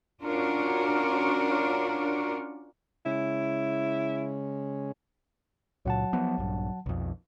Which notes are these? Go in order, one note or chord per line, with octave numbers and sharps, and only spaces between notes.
C#4 D4 F4 F#4 A#4 C#5
C#3 G#3 C#4 E4
C#2 A#2 F#3 F#5 A5
F3 B3
A#1 G2
B1 F2